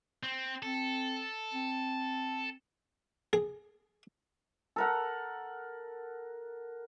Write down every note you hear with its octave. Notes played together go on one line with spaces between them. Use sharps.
C4
C4 A4
C4
G#4
A4 A#4 F#5